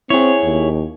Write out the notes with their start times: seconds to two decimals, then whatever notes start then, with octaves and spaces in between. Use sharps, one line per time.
0.10 C4 E4 G#4 C#5
0.43 D#2